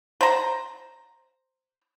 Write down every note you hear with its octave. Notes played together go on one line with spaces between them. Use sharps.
C5 A#5